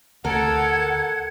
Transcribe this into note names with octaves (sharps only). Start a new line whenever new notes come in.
D2 A4 A#4 F#5 A5 G#6